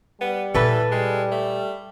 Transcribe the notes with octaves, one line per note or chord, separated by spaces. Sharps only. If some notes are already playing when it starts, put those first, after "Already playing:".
G3 B3
A#2 E3 E4 A4 B4
G3 G#3
A3